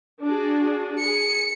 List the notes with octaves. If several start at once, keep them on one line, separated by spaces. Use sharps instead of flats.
D4 F#4 G#4
G#4 C#7